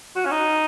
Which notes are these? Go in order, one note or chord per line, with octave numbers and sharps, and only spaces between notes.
F#4
C#4
D#4